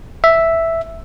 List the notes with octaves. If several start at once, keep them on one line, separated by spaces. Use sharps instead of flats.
E5